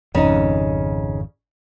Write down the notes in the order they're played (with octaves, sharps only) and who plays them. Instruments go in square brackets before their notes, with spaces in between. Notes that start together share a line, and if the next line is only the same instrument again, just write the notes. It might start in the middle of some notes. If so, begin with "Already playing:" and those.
[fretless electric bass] G#1 F2 [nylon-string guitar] C#3 D#4